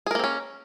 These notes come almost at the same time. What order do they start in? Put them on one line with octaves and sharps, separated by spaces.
G#4 A#4 A#3 C4 C#4